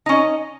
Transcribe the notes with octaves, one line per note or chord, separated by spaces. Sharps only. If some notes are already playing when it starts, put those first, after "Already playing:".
C#4 D#4 D#5